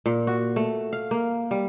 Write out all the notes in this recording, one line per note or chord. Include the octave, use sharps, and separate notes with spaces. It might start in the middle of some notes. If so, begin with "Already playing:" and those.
A#2
F#4
A3
F5
A#3
G3